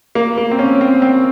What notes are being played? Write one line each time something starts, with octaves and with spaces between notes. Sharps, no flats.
A#3
A#3
C4
C#4
C4
C4